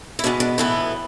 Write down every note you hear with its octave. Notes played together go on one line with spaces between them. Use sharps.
E4
B2 G#3 B3 D4
D4
A2 E3 B3 A4